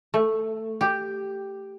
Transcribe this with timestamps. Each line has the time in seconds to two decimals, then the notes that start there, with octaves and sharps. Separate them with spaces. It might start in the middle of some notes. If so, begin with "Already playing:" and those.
0.14 A3
0.81 G4